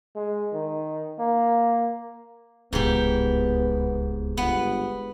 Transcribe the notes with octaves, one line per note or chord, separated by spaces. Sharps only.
G#3
D#3
A#3
D1 C#2 G#2 B3 G4
G1 B3